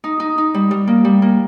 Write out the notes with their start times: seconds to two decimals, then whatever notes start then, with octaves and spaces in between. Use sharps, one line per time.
0.04 D#4
0.20 D#4
0.38 D#4
0.54 G3
0.71 G3
0.87 A#3
1.05 G3
1.22 A#3